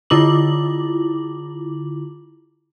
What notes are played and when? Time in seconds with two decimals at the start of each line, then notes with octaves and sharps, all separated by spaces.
0.10 D3 E4 F4 D6 F#7